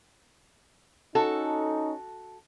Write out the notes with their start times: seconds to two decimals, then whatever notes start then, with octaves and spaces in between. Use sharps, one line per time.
1.15 C#4 D#4 F#4 A4